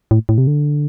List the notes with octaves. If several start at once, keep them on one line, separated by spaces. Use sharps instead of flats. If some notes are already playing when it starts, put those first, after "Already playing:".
A2
A2
C3
D3